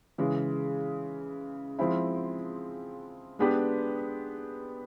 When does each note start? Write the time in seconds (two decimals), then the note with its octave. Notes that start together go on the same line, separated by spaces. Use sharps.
0.18 C#3 E3 G#3
1.79 F3 G#3 C4 E4
3.39 G#3 B3 D4 G4 B4